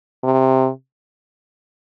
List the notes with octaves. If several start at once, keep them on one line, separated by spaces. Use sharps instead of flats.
C3